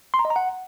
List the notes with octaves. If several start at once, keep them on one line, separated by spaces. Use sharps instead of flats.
C6
A#5
D#5
A#5
F#5